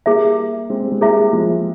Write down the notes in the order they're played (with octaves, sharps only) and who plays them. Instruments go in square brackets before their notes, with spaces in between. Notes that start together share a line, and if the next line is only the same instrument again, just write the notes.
[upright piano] G3 A#3 [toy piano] E4 G#4 E5
[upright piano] G#3 C4
G3
G#3
[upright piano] G3 A#3 [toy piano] E4 G#4 E5
[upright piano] F3 G#3